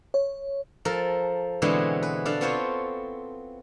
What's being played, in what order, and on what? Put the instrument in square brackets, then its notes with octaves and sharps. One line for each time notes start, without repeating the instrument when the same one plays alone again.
[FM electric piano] C#5
[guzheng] F3 A4 A#4
B2 D3 E3 G#3 B3 C4
B4
D4 A4 F5
B3 C4 F4 C5 C#5